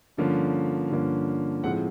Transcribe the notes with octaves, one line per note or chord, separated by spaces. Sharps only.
G2 D3 F3 A#3 C#4
G2 D3 F3 A#3 C#4
A2 F3 G#3 C4 F#5